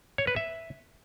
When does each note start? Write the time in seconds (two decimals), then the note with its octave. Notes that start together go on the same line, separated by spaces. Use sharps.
0.18 C#5
0.27 B4
0.36 E5